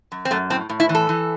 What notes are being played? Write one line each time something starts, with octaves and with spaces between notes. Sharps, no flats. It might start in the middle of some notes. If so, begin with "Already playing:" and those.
F#2
C4
F#2 A3
A2 C4
A2
E4
E3
A4
E3